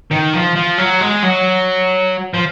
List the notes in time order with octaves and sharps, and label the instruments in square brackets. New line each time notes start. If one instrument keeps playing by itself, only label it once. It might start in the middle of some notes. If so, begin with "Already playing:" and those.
[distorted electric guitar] D#3
F3
F3
F#3
G#3
F#3
F3